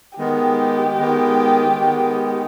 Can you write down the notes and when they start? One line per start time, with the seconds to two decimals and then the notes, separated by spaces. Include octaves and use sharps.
0.18 D#3 G#3 B3 G4
0.98 D#3 G#3 B3
1.78 D#3 G#3 B3